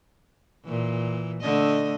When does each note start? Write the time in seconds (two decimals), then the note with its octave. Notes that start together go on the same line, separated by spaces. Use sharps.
0.65 A#2 E3
1.42 D3 A3 D#5